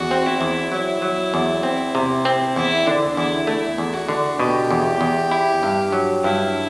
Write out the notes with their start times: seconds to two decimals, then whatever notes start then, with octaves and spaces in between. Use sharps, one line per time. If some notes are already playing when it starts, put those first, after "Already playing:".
Already playing: E2 F#4
0.11 C4
0.26 E4
0.41 E2
0.72 F#3 E4
1.02 F#3
1.34 E2
1.63 C4
1.95 C3
2.25 C4
2.56 E2 E4
2.87 D3 D4
3.17 E2 E4
3.47 A3 E4
3.78 E2
3.94 F#4
4.09 D3
4.39 B2 G4
4.70 E2
5.01 E2
5.31 E4
5.63 G2
5.92 F#3
6.24 G2 E4